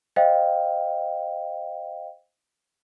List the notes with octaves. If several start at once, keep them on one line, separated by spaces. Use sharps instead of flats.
C5 D#5 F5 G5